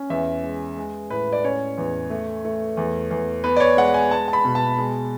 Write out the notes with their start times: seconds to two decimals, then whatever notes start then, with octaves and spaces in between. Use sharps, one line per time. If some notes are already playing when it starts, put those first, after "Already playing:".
Already playing: C#4
0.10 E2 E5
0.43 G#3
0.78 G#3
1.10 A2 B4
1.33 D5
1.44 C#4 C#5
1.78 E2
2.10 A3
2.45 A3
2.77 E2
3.11 E2
3.44 B3 B4
3.56 D5
3.60 C#5
3.77 G#3 F#5
3.94 G#5
4.11 G#3 A5
4.28 A5
4.33 B5
4.45 B2
4.55 A5
4.78 G#3